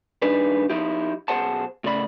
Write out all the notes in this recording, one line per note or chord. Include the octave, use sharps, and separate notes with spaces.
D#2 G3 D4 D#4 G#4 B4
F3 D#4 E4 G4
B1 G#4 C5 F#5 A5
A2 C#3 D5 B5